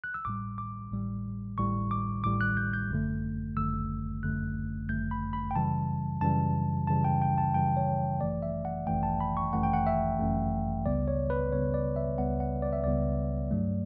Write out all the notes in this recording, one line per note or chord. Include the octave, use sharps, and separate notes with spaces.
F#6
E6
A1 A2 G3 D6
D6
A1 A2 G3
A1 A2 G3 C#6
D6
A1 A2 G3 D6
F#6
G6
G6
G1 F#2 D3 A3
G1 F#2 D3 A3 E6
G1 F#2 D3 A3 F#6
G1 F#2 D3 A3 G6
B5
B5
G5
F#2 C#3 E3 G3 A5
F#2 C#3 E3 G3 A5
F#2 C#3 E3 G3 A5
G5
G5
A5
F#2 C#3 E3 G3 G5
C#5
G1 F#2 E3 A3 D5
E5
F#5
G1 F#2 E3 A3 G5
A5
B5
C#6
G1 F#2 E3 A3 F#5
G5
F#5
E5
G1 F#2 E3 A3
C#2 C#3 G3 B3 D5
C#5
B4
C#2 C#3 G3 B3 C#5
D5
E5
C#2 C#3 G3 B3 F#5
F#5
D5
E5
C#2 C#3 G3 B3 D5
G2 F#3 A3